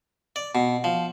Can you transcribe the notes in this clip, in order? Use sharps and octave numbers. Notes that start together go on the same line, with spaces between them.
D5
B2
F3